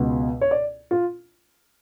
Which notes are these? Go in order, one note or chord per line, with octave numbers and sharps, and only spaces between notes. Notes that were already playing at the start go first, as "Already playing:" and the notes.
Already playing: C#2 B2 G#3 B3
C#5
D5
F4